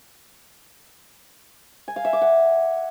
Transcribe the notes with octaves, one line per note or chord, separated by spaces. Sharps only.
G#5
F5
E5
D6
F#5